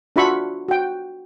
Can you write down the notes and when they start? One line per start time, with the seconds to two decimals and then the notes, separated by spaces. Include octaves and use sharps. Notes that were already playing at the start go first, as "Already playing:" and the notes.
0.16 D4 F4 F#4 E5 B5 C#6
0.68 F#4 G5